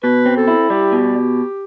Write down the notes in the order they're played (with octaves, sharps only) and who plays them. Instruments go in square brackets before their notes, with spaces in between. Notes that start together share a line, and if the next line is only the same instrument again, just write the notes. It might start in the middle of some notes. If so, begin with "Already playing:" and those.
[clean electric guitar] B2 [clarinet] B4
[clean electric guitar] C4
[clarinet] A4
[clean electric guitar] E4
[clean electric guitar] G3 [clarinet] G4
[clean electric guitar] B2